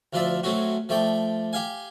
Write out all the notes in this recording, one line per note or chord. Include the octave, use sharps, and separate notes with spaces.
D2 F3 F4 D5 E5
F#3 A3 C4 C#4 F#4
F3 A3 D5 G5
G4 F5 G#5